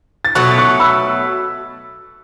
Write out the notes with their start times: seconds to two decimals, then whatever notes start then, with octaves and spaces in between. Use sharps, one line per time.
0.25 A6
0.35 B2 F#3 A3 C#6 F#6
0.58 C#6 F#6
0.80 B5 E6